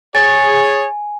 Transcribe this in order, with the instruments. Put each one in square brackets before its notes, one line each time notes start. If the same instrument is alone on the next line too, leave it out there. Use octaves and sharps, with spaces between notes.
[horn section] G#4 C#5 [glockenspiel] G#5 [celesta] A6